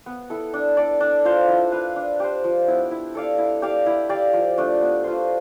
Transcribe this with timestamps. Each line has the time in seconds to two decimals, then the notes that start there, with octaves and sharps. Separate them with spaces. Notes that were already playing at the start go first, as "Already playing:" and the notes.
0.06 B3
0.30 E4 A4
0.54 D4
0.77 A4 D5
1.00 D4
1.25 F4 C5 F5
1.48 E4
1.72 B4 F5
1.96 D4
2.20 G4 C5
2.44 F3
2.68 B3 E4
2.91 E4
3.15 A4 D5 F5
3.38 E4
3.62 G4 D5 F5
3.86 E4
4.09 G4 D5 F5
4.33 F3
4.58 A3 D4
4.81 B3
5.04 F4 C5